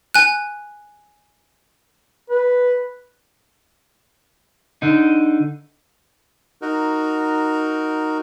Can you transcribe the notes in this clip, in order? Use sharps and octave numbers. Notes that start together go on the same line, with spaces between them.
G#5 F#6
B4
D3 D#4
D#4 F#4 A#4